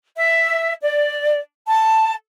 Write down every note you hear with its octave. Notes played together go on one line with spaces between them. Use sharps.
E5
D5
A5